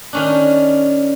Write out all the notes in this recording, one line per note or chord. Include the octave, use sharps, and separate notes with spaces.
D#3 C#4 D4